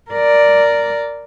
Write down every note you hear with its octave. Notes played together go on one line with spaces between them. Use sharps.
A#4 D5